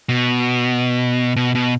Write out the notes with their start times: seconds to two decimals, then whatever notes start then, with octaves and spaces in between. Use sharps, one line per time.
0.09 B2
1.36 B2
1.55 B2